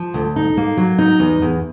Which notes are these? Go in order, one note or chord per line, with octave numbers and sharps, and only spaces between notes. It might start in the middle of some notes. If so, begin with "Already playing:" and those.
Already playing: F3
D2
D#4
A#3
F#3
D#4
E2
E2